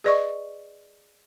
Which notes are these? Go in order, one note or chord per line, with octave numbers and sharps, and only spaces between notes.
G#4 B4 D5 D#5 C#6